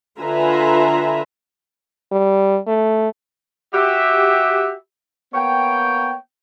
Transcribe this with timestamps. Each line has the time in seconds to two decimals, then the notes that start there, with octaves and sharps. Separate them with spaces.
0.20 D3 F4 B4 E5 G#5 A#5
2.12 G3
2.68 A3
3.74 F#4 G4 E5
5.34 A#3 B3 C#5 G5